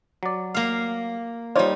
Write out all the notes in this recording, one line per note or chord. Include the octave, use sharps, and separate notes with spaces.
F#3 D5
A#3 F5
G3 D#4 F4 C5 C#5